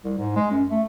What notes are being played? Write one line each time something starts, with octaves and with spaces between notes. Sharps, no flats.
C2
G#2
G#3
F#2
A3